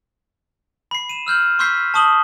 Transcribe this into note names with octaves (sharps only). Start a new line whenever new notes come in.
B5 C7
D#7 E7
E6 F6 G6 F#7
C6 C#6 E6 G6 B6 C7
A5 C#6 D#6 F#7 G7